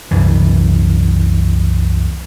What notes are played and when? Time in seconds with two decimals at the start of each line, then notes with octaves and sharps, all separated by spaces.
0.11 C2 F#2 E3